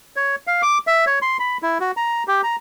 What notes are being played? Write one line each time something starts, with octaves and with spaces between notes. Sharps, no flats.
C#5
F5
D6
E5
C#5
C6
B5
E4
F#4
A#5
G4
A#5